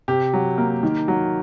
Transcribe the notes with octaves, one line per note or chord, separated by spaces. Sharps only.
C3 G4
F#3
A#3
D#3
F#3